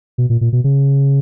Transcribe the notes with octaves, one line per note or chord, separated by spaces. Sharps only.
B2
A#2
A#2
B2
C#3